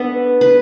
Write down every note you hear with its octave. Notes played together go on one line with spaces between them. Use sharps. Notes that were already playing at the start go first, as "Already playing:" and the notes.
Already playing: B3 D4 A4 B4
B4